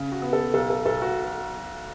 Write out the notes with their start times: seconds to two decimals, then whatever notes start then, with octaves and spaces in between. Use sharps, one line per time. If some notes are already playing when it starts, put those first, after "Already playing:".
Already playing: C#3
0.12 F#4
0.22 B3
0.33 A4
0.54 B1 A4
0.70 A4
0.85 B1 A4
1.02 F#4